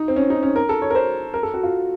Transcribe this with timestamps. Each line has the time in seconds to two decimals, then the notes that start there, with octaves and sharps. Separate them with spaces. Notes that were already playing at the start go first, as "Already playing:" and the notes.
Already playing: D#4
0.08 C4
0.16 C#4
0.30 D#4
0.43 C#4
0.56 A#4
0.69 A4
0.82 C#5
0.90 A#4
0.95 C5
1.34 A#4
1.43 A4
1.54 F#4
1.63 F4